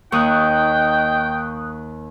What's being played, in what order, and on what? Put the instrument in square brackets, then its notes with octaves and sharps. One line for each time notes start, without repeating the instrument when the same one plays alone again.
[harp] D#2 [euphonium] D#4 [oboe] G5 [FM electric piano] C#6 D#6 F#6